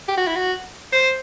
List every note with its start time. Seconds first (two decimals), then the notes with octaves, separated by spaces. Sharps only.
0.08 G4
0.17 F#4
0.27 E4
0.36 F#4
0.92 C5